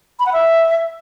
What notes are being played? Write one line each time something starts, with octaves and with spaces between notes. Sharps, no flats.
B5
F#5
E5